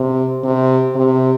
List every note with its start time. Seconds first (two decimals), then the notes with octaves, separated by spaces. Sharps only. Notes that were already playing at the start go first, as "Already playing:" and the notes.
Already playing: C3
0.44 C3
0.95 C3